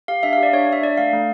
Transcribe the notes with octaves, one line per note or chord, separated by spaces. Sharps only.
G4 F5
D4 E5
F5
G4 D5
D4 C#5
D4 E5
D4 D5
A3 F5
A3